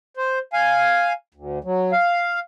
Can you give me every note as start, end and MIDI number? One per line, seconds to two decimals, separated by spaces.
0.17 0.39 72
0.53 1.13 77
0.53 1.13 80
1.34 1.59 38
1.64 1.92 54
1.92 2.40 77